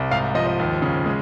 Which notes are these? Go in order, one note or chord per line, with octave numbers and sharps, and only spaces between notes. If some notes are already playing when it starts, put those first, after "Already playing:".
Already playing: C2
G#2 F5
F3 D#5
D#5
D#2
C#3
G#3